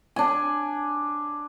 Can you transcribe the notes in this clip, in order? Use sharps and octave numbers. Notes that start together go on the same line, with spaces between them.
D4 G#5